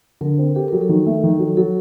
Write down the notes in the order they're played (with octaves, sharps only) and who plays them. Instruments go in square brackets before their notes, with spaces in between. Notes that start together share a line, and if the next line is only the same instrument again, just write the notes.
[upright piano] D3 [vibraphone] A#4
[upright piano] C4
[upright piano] G4 [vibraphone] A4
[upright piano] F#3 [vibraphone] A#4
[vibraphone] A4
[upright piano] D#3
A3
D#3
F#3
[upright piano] F#3 [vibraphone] A4